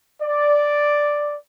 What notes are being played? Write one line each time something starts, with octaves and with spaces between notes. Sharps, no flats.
D5